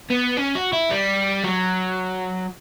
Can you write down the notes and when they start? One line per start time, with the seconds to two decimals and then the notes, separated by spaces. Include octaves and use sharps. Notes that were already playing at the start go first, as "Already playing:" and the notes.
0.10 B3
0.37 C#4
0.55 F#4
0.73 E4
0.91 G3
1.44 F#3